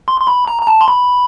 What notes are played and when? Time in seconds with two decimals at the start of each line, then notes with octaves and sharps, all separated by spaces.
0.08 C6
0.21 C6
0.27 B5
0.48 A#5
0.62 A#5
0.67 A5
0.81 C6
0.88 B5